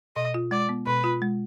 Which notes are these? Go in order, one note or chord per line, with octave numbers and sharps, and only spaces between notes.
B2 D#5
F4
G#3 D5
B3
B2 B4
F4
G#3